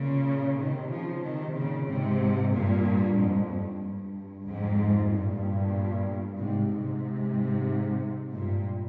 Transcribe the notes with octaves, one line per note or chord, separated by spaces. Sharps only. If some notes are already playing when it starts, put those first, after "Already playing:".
Already playing: A#2 C#3
C3 D#3
C#3 F3
C3 D#3
A#2 C#3
G#2 C3
G2 A#2
F2 G#2
G2
G2
F2 G#2
G2 A#2
G#2 C3
G#2 C3
G2 A#2